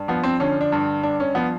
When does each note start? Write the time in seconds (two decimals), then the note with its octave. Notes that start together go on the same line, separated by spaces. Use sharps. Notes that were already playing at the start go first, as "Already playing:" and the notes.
Already playing: G2
0.08 F3 B3
0.24 C4
0.40 D3 C#4
0.61 D4
0.72 G2
1.03 G2 D4
1.20 C#4
1.35 F3 B3